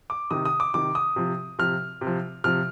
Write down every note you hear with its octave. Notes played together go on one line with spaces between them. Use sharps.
D6
C3 D#3 D#6
D#6
D6
C3 D#3 D6
D#6
C3 F3
C3 F3 F6
C3
F3
C3 F3 F6